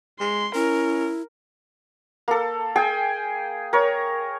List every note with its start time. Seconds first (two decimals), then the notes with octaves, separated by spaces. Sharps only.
0.20 G#3 C6
0.55 C#4 E4 A#4
2.28 A#3 A4
2.76 G#4 G5 G#5
3.73 A#4 C#5